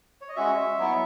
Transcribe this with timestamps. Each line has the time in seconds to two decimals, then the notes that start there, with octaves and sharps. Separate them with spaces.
0.21 C#5
0.29 D#5
0.36 G#3 C#4 F#4 E5
0.79 F#3 B3 E4